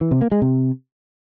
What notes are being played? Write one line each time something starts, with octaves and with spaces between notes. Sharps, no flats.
E3
C3
A#3
G#3
C3